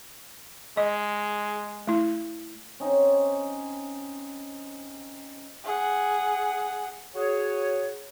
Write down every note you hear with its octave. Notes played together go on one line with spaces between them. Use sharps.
G#3 D#5
A3 E4
C4 C#4 D#4
G#4 F#5
F#4 G#4 C#5